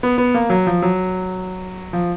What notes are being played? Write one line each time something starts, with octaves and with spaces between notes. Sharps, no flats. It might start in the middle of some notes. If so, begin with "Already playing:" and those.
B3
B3
A#3
F#3
F3
F#3
F3